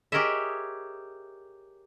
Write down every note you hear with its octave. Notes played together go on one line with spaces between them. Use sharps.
G4 G#4 A#4 C#5 D#5 E5